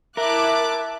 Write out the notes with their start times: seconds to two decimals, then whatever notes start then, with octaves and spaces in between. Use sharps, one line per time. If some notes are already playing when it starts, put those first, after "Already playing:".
0.17 E4 A#4 E5 A5 D6 F#6